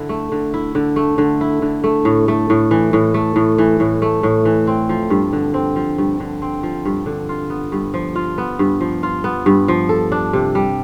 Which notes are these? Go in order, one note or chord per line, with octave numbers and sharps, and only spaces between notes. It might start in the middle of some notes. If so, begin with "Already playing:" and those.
Already playing: D3 E4
A3
D3
E4
D3
A3
D3
E4
D3
A3
A2
A3
A2
E3
A2
A3
A2
E3
A2
A3
A2
E3
C4
F3
G2
D3
C4
F3
G2
D3
C4
F3
G2
D3
F4
B3
G2
F3
F4
B3
G2
F3
F4
B3
G2
F3
A4
D4
C3
G3